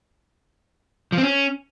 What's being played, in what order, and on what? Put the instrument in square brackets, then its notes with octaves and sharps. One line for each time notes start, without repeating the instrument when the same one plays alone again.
[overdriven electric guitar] F3
C4
C#4